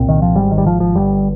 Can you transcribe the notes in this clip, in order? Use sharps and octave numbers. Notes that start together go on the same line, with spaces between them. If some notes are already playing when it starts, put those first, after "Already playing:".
Already playing: C2 A#2 C4
D#3
F3
G#1 G#2 G3
D#3
G3
F3
F3
G1 G2 G3